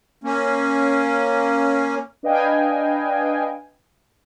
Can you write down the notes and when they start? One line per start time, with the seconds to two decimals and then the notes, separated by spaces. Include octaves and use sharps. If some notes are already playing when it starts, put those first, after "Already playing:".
0.24 A#3 C#4
2.23 D4 B4 D#5 F5 G5 G#5